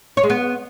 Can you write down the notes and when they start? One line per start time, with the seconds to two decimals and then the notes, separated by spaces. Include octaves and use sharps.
0.17 C#5
0.23 G#3
0.30 B3